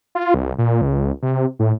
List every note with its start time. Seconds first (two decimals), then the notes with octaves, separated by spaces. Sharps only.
0.15 F4
0.34 C2
0.58 A#2
0.82 C#2
1.22 C3
1.59 A2